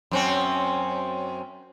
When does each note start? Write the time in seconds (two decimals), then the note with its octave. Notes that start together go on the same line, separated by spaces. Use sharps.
0.11 F#2 C4 C#4